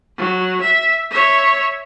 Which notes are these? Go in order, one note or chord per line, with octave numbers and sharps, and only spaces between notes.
F#3
E5
C#5 E5